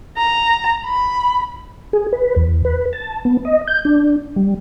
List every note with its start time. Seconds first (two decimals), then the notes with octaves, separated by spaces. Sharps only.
0.17 A#5
0.85 B5
1.93 G#4
2.13 B4
2.36 E2
2.65 B4
2.93 A5
3.25 B3
3.45 D#5
3.68 G6
3.85 D4
4.36 G3